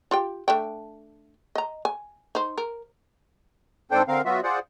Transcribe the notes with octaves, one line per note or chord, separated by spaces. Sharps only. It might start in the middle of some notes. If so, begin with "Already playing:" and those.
F4 G4 G5
A3 D4 G5
D#5 A#5
G#5
D#4 C5
A#4
G#2 C4 D4 A4 C5 G5
D3 C4 A#4 F5
F#3 B3 F4 F#4 E5
F4 G#4 C5 D5 F#5